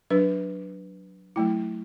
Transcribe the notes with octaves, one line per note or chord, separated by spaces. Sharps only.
F#3 D4 B4
F#3 A3 E4